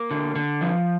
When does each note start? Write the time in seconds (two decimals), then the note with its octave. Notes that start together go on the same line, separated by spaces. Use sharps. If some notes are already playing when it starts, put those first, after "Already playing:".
Already playing: A#3
0.11 D3
0.36 D3
0.61 F3